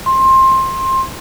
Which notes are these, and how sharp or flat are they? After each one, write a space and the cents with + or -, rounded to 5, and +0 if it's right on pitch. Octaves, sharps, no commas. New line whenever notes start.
C6 +20